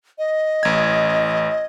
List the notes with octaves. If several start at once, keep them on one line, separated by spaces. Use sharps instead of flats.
D#5
A1 G#6